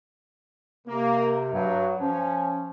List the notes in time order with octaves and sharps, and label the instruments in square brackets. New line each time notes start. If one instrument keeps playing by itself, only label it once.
[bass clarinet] C3 [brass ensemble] A#3
[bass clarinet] G2 [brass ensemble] F#3
[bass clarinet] F3 [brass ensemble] C#4